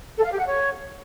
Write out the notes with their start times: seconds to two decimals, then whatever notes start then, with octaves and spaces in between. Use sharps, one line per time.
0.17 A4
0.24 F5
0.31 G4
0.39 F#5
0.46 C#5